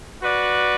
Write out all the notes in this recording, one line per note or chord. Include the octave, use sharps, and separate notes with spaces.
F#4 B4 D5